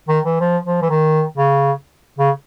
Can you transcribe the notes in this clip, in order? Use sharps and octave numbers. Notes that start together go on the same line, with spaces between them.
D#3
E3
F3
F3
E3
D#3
C#3
C#3